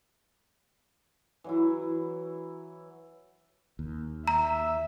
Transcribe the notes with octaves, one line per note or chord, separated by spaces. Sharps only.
E3 F#3 E4
D#2
E5 A#5